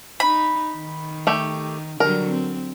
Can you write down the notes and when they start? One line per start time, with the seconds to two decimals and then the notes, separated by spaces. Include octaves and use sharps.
0.20 D#4 B5
0.76 D#3
1.27 A3 G4
2.00 D3 F#3 G3 A#4
2.30 C4